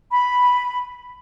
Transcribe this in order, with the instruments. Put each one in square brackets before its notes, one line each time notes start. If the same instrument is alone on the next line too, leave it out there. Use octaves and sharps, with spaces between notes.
[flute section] B5